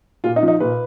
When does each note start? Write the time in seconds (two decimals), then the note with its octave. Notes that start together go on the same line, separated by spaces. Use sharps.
0.24 A#2 F4
0.36 D#4
0.43 F3
0.48 D#4
0.60 A#2 B4